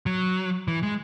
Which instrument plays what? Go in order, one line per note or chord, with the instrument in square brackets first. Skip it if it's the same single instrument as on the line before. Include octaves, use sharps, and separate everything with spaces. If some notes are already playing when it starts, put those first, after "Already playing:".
[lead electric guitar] F#3
E3
G#3